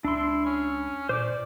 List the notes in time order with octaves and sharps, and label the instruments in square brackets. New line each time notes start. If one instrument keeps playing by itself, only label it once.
[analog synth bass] C#2 [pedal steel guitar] D4 C6 [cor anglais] E4
[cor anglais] C#4
[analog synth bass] A#2 [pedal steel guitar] C5 D6 [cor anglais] D5